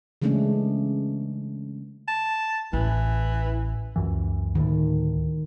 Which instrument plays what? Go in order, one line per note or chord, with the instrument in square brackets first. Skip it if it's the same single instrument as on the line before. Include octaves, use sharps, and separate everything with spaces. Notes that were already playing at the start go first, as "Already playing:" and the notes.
[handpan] C#3 E3 G#3 A3 C#4 D4
[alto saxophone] A5
[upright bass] A1 [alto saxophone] E3
[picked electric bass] C#2 F#2 E3
[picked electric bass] D2 A2 [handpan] D#3